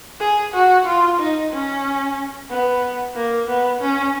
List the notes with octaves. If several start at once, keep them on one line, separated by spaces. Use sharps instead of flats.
G#4
F#4
F4
D#4
C#4
B3
A#3
B3
C#4